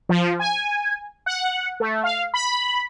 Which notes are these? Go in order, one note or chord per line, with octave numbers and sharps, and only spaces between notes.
F3
G#5
F#5
A3
F5
B5